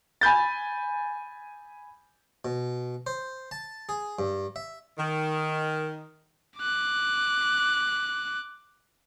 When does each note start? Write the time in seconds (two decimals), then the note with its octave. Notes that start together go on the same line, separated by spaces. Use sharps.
0.21 G#5 B5 G6 A6
2.45 B2
3.07 C5
3.51 A5
3.89 G#4
4.19 G2
4.56 E5
4.98 D#3
6.60 D6 F#6